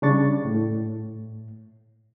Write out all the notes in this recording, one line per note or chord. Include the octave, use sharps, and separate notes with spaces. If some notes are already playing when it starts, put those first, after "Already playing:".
C#3 G3 D4 C#6 A6
A2